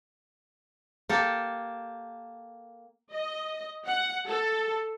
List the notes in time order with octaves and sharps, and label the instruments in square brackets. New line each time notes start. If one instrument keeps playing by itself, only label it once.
[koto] A#3 G4 A4
[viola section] D#5
F#5
A4